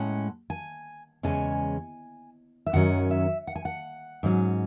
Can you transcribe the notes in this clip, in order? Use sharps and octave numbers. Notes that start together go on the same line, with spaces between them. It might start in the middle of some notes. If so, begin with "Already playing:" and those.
Already playing: A2 G#3 C#4 F#5
G#5
E2 C#3 G#3 C#4 G#5
E5
F#2 D#3 F#3 C#4 F#5
E5
F#5
G#5
F#5
G#2 F#3 C#4